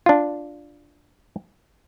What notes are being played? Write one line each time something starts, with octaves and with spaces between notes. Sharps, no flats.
D4 F4